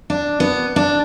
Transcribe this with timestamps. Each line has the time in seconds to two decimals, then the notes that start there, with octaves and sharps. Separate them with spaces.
0.10 D4
0.40 B3
0.76 D4